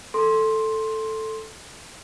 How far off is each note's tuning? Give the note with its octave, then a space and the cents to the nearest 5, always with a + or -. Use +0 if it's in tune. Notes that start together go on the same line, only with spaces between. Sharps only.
A4 +0 C6 +10